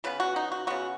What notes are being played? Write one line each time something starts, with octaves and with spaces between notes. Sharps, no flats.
C#3 B3 B4
F#4
D#4
F#4
C#3 B3 F#4